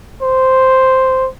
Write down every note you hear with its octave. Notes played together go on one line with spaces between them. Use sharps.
C5